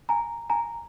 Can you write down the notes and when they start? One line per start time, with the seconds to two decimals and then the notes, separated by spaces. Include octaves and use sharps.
0.09 G#5 A#5
0.50 G#5 A#5